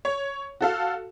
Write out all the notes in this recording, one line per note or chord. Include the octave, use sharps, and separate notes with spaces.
C#5
F#4 A4 F5